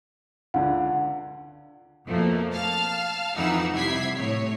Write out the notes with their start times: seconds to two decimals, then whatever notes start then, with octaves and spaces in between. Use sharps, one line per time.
0.54 C#2 D3 F#5
2.06 F2 B2 F3 A3 A#3
2.53 F5 A5 F6
3.35 F2 E3 D#4 E4 F#5 E6
3.73 C3 G3 E4 G#6 B6 C7
4.14 A2 C#5